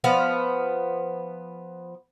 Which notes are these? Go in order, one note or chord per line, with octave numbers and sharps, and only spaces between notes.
F3 B3 F5